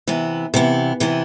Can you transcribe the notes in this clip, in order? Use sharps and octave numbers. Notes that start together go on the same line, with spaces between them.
C3 E3 B3
C3 E3 B3
C3 E3 B3